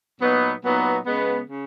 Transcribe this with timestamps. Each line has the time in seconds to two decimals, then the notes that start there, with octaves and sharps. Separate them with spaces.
0.19 A#2 F#3 B3 D#4
0.62 A#2 F#3 B3 D#4
1.05 C#3 G#3 B3
1.49 C#3